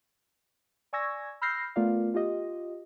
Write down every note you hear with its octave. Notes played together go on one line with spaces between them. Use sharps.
D5 G#5 C#6 E6 G#6 A#6
B5 E6 F6 G6 A#6 C7
A3 B3 F4 A#4 D5 F5
F4 G4 D#5